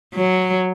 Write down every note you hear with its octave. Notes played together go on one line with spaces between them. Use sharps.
F#3